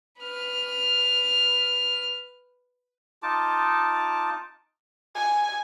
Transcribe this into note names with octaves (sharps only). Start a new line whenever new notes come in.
B4 F6
D#4 F4 A5 D6
G#5